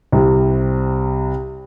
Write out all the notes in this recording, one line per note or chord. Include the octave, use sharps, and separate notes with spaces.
C2 C3